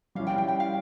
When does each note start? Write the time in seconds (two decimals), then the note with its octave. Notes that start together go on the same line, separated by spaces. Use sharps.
0.15 G3 C#4 E4 F5
0.27 G5
0.38 G5
0.48 G5
0.60 F5